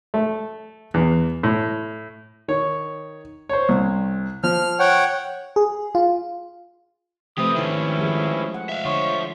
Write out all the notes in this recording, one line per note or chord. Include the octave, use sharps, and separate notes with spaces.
A3
E2
A2
D#3 C#5
C5 C#5
C2
F3 F6
C#5 F#5 G5
G#4
F4
C3 F3 A3 G4 B4 C5 D#6
G#2 D#3 C#4 E4
F3 G#3 G#4
F#5
E5 F5
D3 F4 C5 C#5